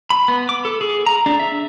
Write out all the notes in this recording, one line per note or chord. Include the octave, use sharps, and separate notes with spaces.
B5
B3
D6
A4
G#4
A#5
D4
E5